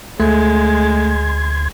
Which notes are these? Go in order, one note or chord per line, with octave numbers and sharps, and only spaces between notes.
D2 G#3 A3 C6 G#6